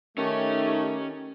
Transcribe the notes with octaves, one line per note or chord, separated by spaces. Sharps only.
D#3 A3 C#4 D#4 G4 C#5